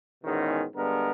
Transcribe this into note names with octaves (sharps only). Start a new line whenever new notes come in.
E2 G#2 B2 D#3 C#4
G2 D3 G#3 B3 A#4